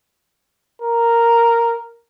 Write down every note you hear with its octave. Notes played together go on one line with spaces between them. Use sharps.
A#4